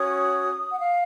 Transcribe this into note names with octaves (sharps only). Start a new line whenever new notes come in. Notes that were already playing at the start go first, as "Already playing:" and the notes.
Already playing: C#4 F#4 C#5 D#6
F#5
F5